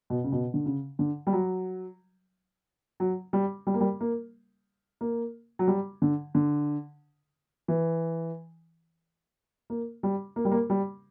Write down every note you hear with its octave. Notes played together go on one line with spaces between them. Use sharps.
B2
C#3
B2
D3
C#3
D3
G3
F#3
F#3
G3
G3
A#3
G3
A#3
A#3
F#3
G3
D3
D3
E3
A#3
G3
A#3
G3
A#3
G3